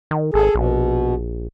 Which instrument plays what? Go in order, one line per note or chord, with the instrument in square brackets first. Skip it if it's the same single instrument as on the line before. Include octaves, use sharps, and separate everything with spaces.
[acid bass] D#3
[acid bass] G#1 [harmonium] G#4 A4
[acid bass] A#1 [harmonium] B2